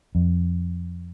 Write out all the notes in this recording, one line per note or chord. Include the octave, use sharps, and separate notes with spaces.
F2